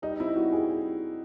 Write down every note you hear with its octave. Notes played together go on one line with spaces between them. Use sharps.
G3 D#4
C4 E4
G3 F#4
C4 G#4